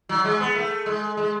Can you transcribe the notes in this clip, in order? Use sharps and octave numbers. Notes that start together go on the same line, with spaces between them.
F#3
G#3
B3
A3
G#3
G#3